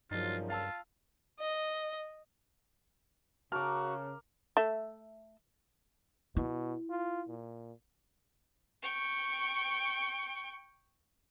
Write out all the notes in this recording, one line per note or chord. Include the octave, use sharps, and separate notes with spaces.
G2 A#2 C#3 F3 F#3 D#4 F4
F4 F5 A5 E6
D#5
C#3 F#4 A#4 A5 D6 F6
A3 E5
B2 E4
F4
A#2
G5 C#6